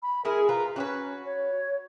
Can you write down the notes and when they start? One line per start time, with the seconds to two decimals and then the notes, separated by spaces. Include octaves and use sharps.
0.02 B5
0.25 G#3 E4 G#4 A#4
0.49 F4 B4 A#5
0.76 C#4 F#4 G4 B4
1.25 C#5